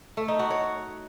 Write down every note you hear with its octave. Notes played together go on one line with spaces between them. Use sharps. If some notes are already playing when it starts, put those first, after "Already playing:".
A3
D#4
F#4
C#5